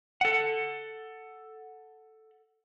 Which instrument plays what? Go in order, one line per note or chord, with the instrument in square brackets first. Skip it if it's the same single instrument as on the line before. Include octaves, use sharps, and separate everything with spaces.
[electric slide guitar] A4 F#5